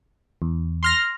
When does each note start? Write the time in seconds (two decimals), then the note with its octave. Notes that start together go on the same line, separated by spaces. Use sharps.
0.42 E2
0.83 C6 F6 A#6